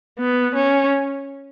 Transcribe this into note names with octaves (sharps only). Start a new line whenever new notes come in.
B3
C#4